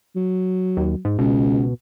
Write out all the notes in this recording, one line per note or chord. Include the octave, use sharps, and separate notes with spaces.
F#3
D#2
G#2
C#2 B2